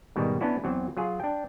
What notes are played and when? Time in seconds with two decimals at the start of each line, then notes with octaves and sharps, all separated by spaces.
0.16 G#2 B2 D#3 G3
0.41 B3 C#4 D4 E4 F#4
0.64 E2 F#3 C4
0.97 F#3 F4 G#4
1.20 D4 G5